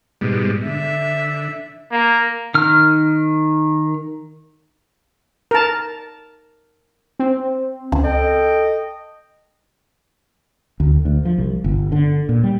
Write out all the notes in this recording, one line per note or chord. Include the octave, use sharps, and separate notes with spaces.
G#2 B2 G3
D3 E5
A#3
D#3 F6
A#4 A5
C4
C#2
A4 D#5 G5
D2
D2
F3
C2
G1
D3
A#2
G3